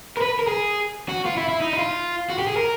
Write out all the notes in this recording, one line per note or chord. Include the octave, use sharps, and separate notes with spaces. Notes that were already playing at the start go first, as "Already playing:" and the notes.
A#4
B4
A#4
G#4
F#4
F4
E4
E4
D#4
E4
F4
F#4
G4
G#4
A#4